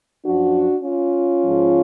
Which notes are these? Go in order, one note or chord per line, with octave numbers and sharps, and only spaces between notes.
F#2 F3 D4 F#4
C#4 F4
G#2 F3